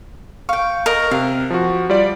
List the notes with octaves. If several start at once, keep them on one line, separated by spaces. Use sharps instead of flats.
F5 G5 C#6
A#4 D#5
C3 F5
F3 F#4
G3 F4 D5